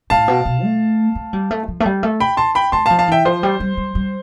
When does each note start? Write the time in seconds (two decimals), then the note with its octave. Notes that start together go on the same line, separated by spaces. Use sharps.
0.10 A2 F5 A5
0.28 B2
0.45 B2
0.63 A3
1.15 A3
1.33 G3
1.51 A3
1.68 F3
1.80 A3
1.85 G3
2.03 A3
2.20 G5 B5
2.37 A5 C6
2.55 G5 B5
2.72 A3 A5 C6
2.86 F5 A5
2.90 F3
2.98 F5 A5
3.08 E3 E5 G5
3.25 F3 C5
3.43 G3
3.60 G3
3.77 G3
3.95 G3